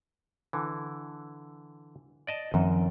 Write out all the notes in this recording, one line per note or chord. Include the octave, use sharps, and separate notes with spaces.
D3 E3
D5 D#5 A5
F#2 D#3 F3 C4